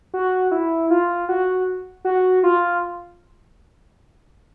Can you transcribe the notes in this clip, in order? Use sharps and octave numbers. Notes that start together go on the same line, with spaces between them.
F#4
E4
F4
F#4
F#4
F4